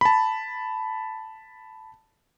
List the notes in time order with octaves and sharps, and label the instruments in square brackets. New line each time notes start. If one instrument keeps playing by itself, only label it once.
[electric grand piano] A5 B5